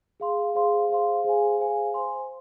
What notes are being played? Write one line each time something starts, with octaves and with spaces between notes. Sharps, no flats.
G#4 F5 C6
G#4 C5 F5 C6
G#4 C5 F5 C6
G#4 C5 F5 G#5
G#4 C5 F5 G#5
C5 G#5 C6